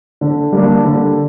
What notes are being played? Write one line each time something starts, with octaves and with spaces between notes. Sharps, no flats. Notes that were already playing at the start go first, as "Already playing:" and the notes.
D3
G3 A#3 D4
D3